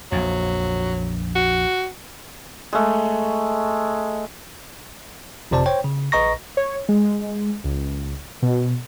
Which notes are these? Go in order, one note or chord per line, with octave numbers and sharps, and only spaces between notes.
A#1 F2 F#3
F#4
G#3 A3
G1 F2 C3 C5 D5 A5
C5 C#5 G5
C#3
A#1 B4 D#5 A#5 C#6 A#6
C#5
G#3
C#2
B2